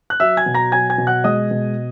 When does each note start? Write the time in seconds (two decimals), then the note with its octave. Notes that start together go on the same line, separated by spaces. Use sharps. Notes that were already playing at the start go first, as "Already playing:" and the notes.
0.10 F#6
0.20 F#3 E5 E6
0.37 G#5 G#6
0.46 B2
0.54 A#5 A#6
0.72 F#3 G#5 G#6
0.90 G#5 G#6
0.98 B2
1.07 F#5 F#6
1.24 G#3 D#5 D#6
1.51 B2